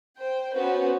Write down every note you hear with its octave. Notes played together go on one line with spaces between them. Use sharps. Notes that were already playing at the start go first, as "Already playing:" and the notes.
C5 G5
B3 C#4 F#4 B4 C5